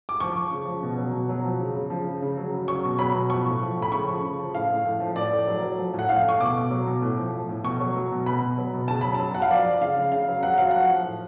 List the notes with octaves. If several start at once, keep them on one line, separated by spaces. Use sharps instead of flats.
D6
F3 C#6
F3
C#3
F3
B2
F#3
B2
F#3
F3
C#3
C#3
F3
C#3
C#3
F#3
C#3
F#3 C#6
B2
F#3 B5
B2
F3 C#6
A2
F3
A2
B5
C#3 C#6
F3
C#3
F3
A2 F5
A2
A2
F3
A2 D5
A2
F#3
F#3
F3
A2
F#5
A2 F5
A2 C#6
B2 D6
B2
F#3
B2
A2
F3
F3
A2
B2 C#6
F#3
F#3
B2
B2 B5
B2
F#3
B2
C#3 A5
F#3 B5
F#3 A5
F#3 F#5
F5
F3 D5
F3
C#3 F5
C#3
C#3 F5
F#3
F#3 F#5
F#3 F5
F3 F#5
F3
A2